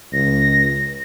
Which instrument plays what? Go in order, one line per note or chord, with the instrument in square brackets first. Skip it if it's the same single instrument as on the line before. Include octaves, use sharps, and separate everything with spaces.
[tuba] C#2 [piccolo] A#6